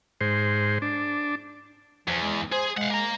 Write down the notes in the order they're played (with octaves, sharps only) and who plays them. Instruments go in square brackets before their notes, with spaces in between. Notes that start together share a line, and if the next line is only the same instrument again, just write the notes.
[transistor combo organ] G#2 C5
D4
[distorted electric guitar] E2 [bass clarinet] F3
[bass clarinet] G#3
[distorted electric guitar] G#4 [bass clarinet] C5
[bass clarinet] G#3 [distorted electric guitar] F5 F#5
[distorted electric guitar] A#3 A#5